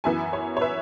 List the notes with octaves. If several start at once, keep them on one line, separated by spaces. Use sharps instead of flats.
F#2 E3 B3 E5 G#5
C#5
C#5
B4 E5